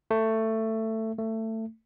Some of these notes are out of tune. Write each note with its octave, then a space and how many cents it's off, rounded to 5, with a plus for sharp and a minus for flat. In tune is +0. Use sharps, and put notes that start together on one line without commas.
A3 +15
A3 +20